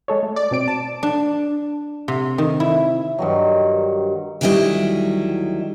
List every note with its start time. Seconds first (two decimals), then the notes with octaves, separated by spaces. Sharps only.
0.08 G#3 A4 C#5
0.23 A3
0.36 D5
0.51 B2 C4 D7
0.68 A5
1.03 D4
2.08 C3
2.38 D#3
2.60 E4
3.19 G2 D#3 F#3
4.41 D2 D#3 F#3 G3 E4 D#5